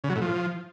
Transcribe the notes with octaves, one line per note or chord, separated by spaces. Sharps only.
C#3
F#3
A2
F3